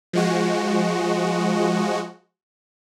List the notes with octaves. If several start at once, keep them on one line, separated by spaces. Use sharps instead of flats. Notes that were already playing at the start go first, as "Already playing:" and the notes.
F3 G#3 F#4